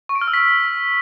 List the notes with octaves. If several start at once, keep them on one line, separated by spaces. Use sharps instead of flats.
C#6
D7
F6
E6
B6